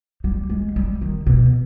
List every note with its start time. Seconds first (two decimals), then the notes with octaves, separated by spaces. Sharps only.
0.24 G3
0.50 G#3
0.76 G3
1.01 D#3
1.26 B2